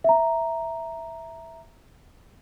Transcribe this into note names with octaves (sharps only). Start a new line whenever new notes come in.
E5 A#5